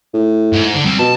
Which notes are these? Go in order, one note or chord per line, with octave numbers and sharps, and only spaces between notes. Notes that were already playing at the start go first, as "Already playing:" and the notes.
A2
G#2
D3
G3 C4
B2 A5